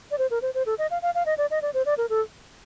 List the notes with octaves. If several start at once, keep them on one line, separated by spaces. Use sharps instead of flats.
D5
C5
A#4
C5
C5
A4
D#5
F5
F5
F5
D#5
D5
D#5
D5
C5
D5
A#4
A4